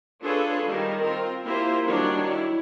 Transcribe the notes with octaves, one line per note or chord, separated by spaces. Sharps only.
D4 F4 G#4 A4 B4 C#5
D#3 G3 A#4
C4 F4 A#4
A#3 E4 F4 G4 A#4 C5
D#3 F#3 G3 D4 C#5 D5
E4